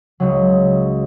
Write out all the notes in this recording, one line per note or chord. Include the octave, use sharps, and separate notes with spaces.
C#2 C#3 F#3